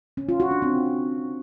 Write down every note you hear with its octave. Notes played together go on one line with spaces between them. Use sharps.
C#4
F4
F#4
D4
C4